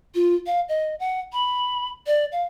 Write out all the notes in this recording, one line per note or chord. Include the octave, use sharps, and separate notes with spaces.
F4
F5
D#5
F#5
B5
D5
F5